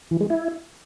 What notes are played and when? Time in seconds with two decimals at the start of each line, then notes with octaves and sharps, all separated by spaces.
0.11 E3
0.21 G#3
0.30 E4